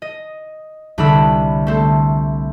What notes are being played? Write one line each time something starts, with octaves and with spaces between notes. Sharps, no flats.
D#5
C2 D3 D4 B5 E6
A3 C4 A4